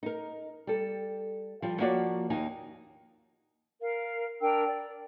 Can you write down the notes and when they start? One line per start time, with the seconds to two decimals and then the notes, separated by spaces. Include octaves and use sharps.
0.03 D#4 A#4
0.67 G3 A4
1.62 F3 G3
1.80 F3 A#3 F#4 C#5 D5
2.30 D#2 D#4 G#5
3.81 A#4 F5
4.41 D4 A#4 G5 E6
4.68 D5